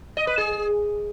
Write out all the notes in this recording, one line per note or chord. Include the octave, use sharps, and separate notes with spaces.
D#5
B4
G#4